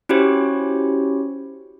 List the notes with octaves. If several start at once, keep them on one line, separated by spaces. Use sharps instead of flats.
C#4 E4 F#4 G4 C5 C#5